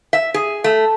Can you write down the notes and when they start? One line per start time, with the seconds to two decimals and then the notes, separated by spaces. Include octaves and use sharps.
0.13 E5
0.34 G#4
0.64 A3